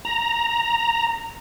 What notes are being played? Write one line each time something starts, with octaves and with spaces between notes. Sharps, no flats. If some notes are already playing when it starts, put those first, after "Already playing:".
A#5